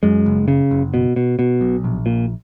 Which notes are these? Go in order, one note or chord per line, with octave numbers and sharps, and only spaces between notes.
F#2 G#3
F#1
C#3
F#1
B2
B2
B2
B1
A#1
A#2